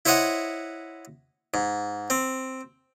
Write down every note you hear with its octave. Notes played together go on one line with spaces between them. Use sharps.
E4 C5 C#5 D#5 E5 F#5
G#2
C4